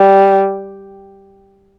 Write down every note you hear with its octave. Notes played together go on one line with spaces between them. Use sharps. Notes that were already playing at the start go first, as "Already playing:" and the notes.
Already playing: G3